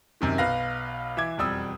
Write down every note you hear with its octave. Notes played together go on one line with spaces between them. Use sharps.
F#2 C3 D#3
B1 B4 F5 A#6
E3 E5 D6 G#6
E1 F2 G3 D#6 E6